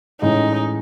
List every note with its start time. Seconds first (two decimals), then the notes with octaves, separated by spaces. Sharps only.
0.21 A2 E3 G#3 C#4 D#4